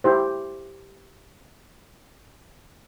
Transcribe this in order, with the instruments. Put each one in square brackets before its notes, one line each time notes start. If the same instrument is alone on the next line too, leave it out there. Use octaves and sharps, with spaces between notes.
[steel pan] E4 G4 C5